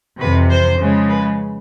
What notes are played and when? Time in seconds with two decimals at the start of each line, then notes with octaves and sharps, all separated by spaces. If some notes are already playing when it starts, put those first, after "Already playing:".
0.20 F2 C3 E3 B4
0.50 C5
0.79 C#3 F3 G#3
1.09 B4